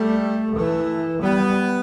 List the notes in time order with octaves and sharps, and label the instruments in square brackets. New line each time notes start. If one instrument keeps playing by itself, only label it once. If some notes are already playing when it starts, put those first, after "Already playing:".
Already playing: [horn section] G3 [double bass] A3
[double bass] E3 [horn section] A3
[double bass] G3 [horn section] B3